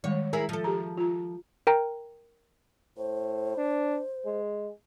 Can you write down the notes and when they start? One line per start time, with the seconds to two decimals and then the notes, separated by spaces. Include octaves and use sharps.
0.04 D#3 G3 G#3 C#5
0.33 E4 G#4 A#4
0.49 F3 A4
0.64 G4 G#4 A#5
0.97 F4 A#5
1.67 A#4 G5 A#5
2.98 A2 C5
3.57 D4
4.26 G#3